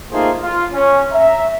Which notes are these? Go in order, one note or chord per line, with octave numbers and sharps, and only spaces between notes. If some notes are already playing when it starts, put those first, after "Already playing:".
A3 A#3 D#4 F4 G#4 C5
F4
C#4
E5 A#5